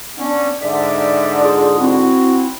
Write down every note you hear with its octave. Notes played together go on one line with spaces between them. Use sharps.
B3 C#4 D4
G#2 D3 D5 E5
F4 G#4
C4 E4 F#4